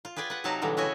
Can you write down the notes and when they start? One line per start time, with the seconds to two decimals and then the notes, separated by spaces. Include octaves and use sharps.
0.05 F4
0.16 G#4 B4 D5 G5 G#5
0.30 B4 F#5
0.44 C3 F#3 D#4 F#4 F5 A5
0.62 B2 D3 E3 G3 G#3
0.77 C#3 E4 F#4 C#5 D#5 G#5